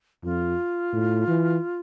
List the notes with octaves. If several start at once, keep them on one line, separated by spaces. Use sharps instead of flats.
F2 F4
A2
E3